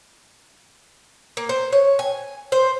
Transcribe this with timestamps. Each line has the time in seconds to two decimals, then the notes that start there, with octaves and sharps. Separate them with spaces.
1.37 A#3
1.49 C5
1.72 C#5
1.99 G#5
2.52 C5